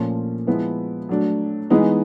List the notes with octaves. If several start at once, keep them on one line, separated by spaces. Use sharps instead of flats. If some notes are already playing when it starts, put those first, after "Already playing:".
Already playing: A#2 F3 A3 C#4
F3 G#3 B3 E4
F#3 A3 D4
E3 G#3 B3 D#4